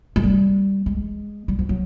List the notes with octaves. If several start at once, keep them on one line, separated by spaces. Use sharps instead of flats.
G#3
G3
G#3
G3
F3
F#3